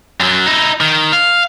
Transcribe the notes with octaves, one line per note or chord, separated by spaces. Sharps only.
F#2 F#3
D#4 E4
D#3
F5